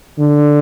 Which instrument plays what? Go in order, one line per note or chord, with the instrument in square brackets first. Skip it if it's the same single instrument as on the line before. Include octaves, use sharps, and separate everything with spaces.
[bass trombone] D3